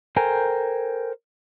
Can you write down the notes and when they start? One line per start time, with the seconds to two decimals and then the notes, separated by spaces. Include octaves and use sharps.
0.16 A4 A#4 C5 G5 G#5 A#5